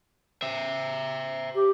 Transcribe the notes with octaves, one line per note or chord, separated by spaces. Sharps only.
C5 E5
G4